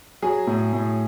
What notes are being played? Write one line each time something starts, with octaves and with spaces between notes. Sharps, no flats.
F#3 G#4
A2
A2